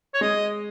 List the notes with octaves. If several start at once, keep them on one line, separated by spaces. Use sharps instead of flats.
C#5
G#3 D#5